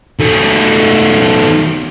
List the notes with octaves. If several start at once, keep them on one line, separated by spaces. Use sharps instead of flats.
D#3 A3